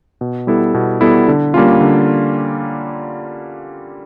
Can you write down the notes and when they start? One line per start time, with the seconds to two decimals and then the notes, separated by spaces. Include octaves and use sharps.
0.21 B2
0.47 G3 B3 E4 A4
0.74 B2
1.01 G3 B3 E4 A4
1.28 D3
1.54 G3 A#3 C#4 F4
1.81 D3